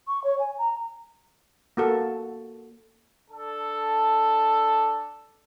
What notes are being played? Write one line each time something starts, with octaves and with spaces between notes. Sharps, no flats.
C#6
C#5
G#5
A#5
A#3 F#4 A4
D4 A4